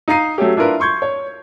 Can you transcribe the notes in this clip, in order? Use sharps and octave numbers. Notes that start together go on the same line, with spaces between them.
D#4 F5 A#5 C7 D#7
F#3 A3 C#4 G4
D4 E4 F4 A#4 B4
C6 C#6 G6 G#6
C#5